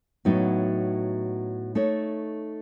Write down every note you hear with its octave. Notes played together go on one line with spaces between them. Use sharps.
A2 F#3 B3 D#4
A3 D#4 A4 C#5